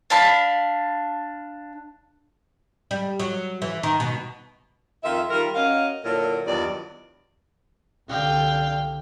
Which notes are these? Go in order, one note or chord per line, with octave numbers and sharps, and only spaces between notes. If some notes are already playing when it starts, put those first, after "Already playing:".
D4 F5 A5 B5
G3
F#3
E3
D#3
B2
F2 D#3 F4 E5
D#3 G3 F4 A#4
C#4 F#4 A#4 D#5 F5
A#2 D3 F#3 E4 A#4
E2 G2 D#3 F#3 F4 D5
C2 D3 F5 G5